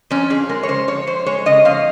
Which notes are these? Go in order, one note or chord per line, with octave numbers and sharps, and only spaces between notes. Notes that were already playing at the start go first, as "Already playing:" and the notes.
F2 C#4
F2 G#4
G#3 A#4
C#5
C#3 C5
F2 C#5
F2 C5
G#3 C#5
C#3 D#5
F2 F5